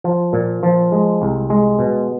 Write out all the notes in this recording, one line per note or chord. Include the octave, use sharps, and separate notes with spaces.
F3
A#2
F3
G#3
C2
G#3
B2